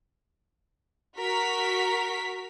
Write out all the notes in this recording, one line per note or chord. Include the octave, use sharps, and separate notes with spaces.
F#4 A#4 B6